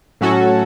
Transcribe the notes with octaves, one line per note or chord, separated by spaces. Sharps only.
A2 F#3 C#4 F#4 A4